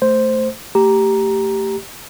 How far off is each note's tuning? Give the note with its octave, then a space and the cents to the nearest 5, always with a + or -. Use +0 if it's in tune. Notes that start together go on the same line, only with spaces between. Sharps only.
A3 +0 C5 +0
A3 +25 G4 -5 A#5 +5